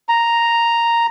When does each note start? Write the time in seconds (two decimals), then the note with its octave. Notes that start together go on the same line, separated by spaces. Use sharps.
0.09 A#5